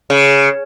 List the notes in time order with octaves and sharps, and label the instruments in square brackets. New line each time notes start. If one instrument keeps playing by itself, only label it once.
[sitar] C#3